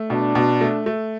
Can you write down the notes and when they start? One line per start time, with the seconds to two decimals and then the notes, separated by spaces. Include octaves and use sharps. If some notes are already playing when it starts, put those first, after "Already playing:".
Already playing: A3
0.09 B2 D4
0.35 B2
0.61 A3
0.86 A3